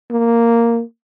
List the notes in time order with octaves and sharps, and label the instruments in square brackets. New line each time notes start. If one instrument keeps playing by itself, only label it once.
[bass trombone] A#3